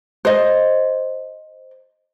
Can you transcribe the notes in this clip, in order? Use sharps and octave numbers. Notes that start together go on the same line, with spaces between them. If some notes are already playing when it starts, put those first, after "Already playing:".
C5 D#5